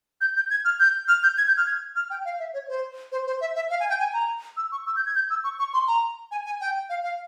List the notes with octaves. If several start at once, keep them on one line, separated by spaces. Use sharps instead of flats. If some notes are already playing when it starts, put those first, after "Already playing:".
G6
G6
G#6
F6
G6
F6
G6
G#6
G6
F6
G#6
F6
G5
F5
E5
C#5
C5
C5
C5
E5
E5
F5
G#5
G5
G#5
A#5
E6
C#6
E6
G6
G#6
G6
E6
C#6
C#6
C6
A#5
G#5
G#5
G5
F5
F5